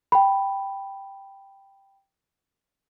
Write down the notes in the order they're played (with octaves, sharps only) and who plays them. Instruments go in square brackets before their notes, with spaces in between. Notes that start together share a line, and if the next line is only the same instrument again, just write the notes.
[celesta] G5 B5